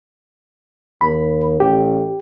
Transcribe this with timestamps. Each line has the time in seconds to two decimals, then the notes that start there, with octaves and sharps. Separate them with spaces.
1.01 D#2 B5
1.60 A1 G4